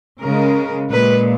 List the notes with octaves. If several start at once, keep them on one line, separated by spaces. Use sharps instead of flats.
C#3 G#3 A#4
A#2 G#3 B4